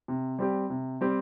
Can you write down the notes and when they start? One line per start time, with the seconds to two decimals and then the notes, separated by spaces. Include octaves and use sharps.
0.08 C3
0.39 G3 C4 G4
0.70 C3
1.01 G3 C4 G4